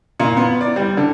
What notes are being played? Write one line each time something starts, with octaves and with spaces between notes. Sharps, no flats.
A#2
B3
D5
G3
D3